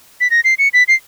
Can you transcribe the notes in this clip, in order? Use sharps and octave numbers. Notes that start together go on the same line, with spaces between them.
B6
A#6
C7
C#7
B6
C7